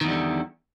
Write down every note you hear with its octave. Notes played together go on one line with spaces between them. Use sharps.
E2 D3 D#3 G3